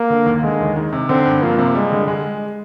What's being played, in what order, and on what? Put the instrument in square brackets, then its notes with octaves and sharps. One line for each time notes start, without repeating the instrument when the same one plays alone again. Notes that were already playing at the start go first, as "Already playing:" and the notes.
Already playing: [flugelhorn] A#3
[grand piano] D3
D#2
[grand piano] D3 [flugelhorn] G#3
[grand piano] D#2
D#3
C3
[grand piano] D3 [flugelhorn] C4
[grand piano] G2
[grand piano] F3 [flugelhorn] A#3
[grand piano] C3
[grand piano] G3 [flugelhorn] G#3
[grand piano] D3
G#3